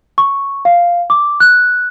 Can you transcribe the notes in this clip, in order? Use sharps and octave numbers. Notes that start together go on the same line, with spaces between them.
C#6
F5
D6
F#6